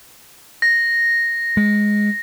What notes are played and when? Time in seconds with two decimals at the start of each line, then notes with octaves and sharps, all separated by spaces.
0.62 A#6
1.57 G#3